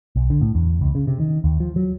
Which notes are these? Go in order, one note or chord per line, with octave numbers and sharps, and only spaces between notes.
B1
D3
A2
E2
C#2
C#3
C3
D#3
D#2
F3
F#3